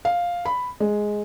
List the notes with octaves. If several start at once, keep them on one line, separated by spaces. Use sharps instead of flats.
F5
B5
G#3